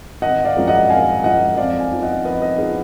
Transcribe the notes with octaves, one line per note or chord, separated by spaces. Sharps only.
G#1 D#5 F#5
D5 F5
F#2 F3 G#3
D#5 F#5
G#1 F5 G#5
F#2 F3 G#3 D#5 F#5
F2 D5 F5
F5 G#5
F3 B3 D#4
D#5 F#5
F2 B4 D#5
B4 D#5
F3 B3 D#4 G#4 B4